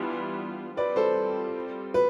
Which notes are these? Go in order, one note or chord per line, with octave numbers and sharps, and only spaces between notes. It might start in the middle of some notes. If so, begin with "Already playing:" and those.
Already playing: E3 G3 B3 D4 F4
G3 C4 F4 B4 D5
A4 C5
B4